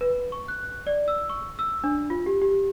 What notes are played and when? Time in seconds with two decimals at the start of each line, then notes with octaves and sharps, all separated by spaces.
0.01 B4
0.32 C#6
0.48 F#6
0.87 D5
1.08 E6
1.29 C#6
1.59 E6
1.84 D4
2.10 F4
2.26 G4
2.41 G4